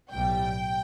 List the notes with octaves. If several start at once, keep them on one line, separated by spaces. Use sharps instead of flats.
B1 A2 G3 G5